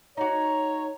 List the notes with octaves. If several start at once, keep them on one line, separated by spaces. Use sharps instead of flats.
D#4 F#4 C#5 A#5